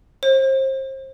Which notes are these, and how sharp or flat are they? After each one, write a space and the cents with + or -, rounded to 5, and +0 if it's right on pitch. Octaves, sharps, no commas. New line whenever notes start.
C5 +30